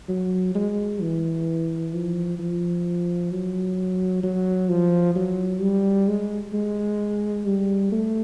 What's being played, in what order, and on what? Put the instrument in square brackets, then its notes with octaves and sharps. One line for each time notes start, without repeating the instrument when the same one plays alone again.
[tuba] F#3
G#3
E3
F3
F3
F#3
F#3
F3
F#3
G3
G#3
G#3
G3
A3